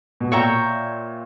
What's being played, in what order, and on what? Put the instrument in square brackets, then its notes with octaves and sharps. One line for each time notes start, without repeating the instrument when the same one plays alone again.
[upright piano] B2
[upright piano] A#2 [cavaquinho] C#5 E5 G5 A#5